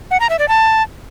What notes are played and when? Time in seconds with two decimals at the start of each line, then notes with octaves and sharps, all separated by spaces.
0.11 F#5
0.20 A#5
0.30 E5
0.39 D5
0.48 A5